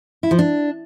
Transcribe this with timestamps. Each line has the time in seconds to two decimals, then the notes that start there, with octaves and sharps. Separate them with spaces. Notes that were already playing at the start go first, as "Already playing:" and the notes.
0.23 E4
0.31 F3
0.39 D4